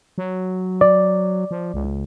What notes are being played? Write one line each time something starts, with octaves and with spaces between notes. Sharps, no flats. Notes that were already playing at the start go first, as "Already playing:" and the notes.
F#3
D5
F3
C#2